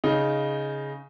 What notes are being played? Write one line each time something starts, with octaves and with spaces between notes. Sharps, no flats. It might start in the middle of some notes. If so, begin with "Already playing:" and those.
C#3 D#4